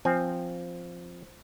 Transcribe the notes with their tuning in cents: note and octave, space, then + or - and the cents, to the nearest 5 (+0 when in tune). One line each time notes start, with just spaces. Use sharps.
F3 +0 C4 +0 G#5 +0